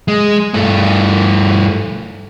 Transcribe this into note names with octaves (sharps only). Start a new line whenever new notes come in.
G#3
G2 A3